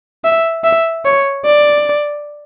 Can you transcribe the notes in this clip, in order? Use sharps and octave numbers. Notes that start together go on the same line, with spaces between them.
E5
E5
C#5
D5